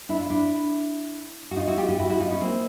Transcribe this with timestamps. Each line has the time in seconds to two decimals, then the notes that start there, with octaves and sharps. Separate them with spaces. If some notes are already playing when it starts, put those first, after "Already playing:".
0.09 D4 E4
0.20 F4
0.30 D4 E4
1.51 F#4
1.56 D#4 F4
1.68 E4 F#4
1.77 F4 G4
1.89 F4 G4
1.99 E4 F#4
2.09 E4 F#4
2.20 D#4 F4
2.30 C#4 D#4
2.41 A#3 C4